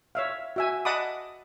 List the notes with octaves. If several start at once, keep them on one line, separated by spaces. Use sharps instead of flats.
C#5 E5 F5
F#4 E5 G#5
D#5 F#5 A5 B5 D6 D#6